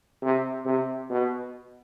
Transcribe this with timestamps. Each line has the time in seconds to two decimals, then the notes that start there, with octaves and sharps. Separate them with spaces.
0.22 C3
0.65 C3
1.10 B2